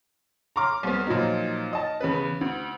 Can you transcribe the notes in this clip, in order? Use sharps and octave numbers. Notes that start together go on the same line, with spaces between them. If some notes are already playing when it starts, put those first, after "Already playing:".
A#5 C6 D6 F6
C2 B3
A#2 F3 F#3 D#4
D#5 A5
E2 C#3 B4
D2